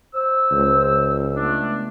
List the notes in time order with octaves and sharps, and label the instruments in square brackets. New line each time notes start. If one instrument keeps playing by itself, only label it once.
[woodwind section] C5 E6
[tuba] C#2
[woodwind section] A3 B3 D4